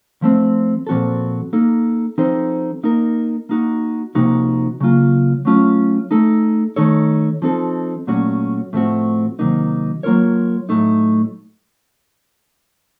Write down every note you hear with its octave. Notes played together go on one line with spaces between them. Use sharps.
F3 A3 C4
A#2 F3 C4 F#4 A4
A#3 D#4 A4
F3 C4 D#4 A4 C5
A#3 D#4 A#4
A#3 D#4 F#4
C3 F3 A#3 D#4 F#4
C#3 F#3 A#3 F4
F#3 A3 C#4 F4
A3 D#4 A4
D#3 A3 D#4 A4 C#5
F3 C4 D#4 A4
A#2 F#3 A3 C#4 F#4
A2 F3 A3 C4 F#4
C3 D#3 F#3 A#3 D#4
F#3 A#3 F4 A#4 C#5
A2 F#3 A3 D#4